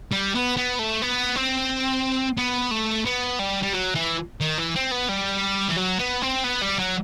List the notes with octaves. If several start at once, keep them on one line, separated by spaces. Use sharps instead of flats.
G3
B3
B3
A3
B3
C4
B3
A3
B3
G3
G3
F#3
E3
D#3
E3
C4
B3
G3
E3
F#3
B3
C4
B3
G3
F#3